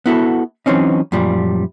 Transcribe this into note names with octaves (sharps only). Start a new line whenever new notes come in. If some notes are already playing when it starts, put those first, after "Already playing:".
B3 E4 F#4 A4
E3 F#3 C4 C#4 D#4
F#2 A#2 F3 G3